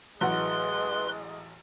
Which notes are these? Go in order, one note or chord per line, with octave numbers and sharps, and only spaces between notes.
A1 F#3 G#3 B4 D#5 F#5 C6